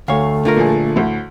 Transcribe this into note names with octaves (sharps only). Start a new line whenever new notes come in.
D2 A3 C#5 F5
D3 F4 A#4
A#2 F3 G#4
D2 A2